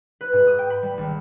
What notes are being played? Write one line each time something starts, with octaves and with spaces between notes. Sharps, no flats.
B4
G#2
D#6
G5
B5
G3
G#1